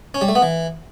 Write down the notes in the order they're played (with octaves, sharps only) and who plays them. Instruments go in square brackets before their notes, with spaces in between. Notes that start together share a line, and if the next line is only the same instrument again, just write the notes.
[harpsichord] C#4
G3
A3
B3
E3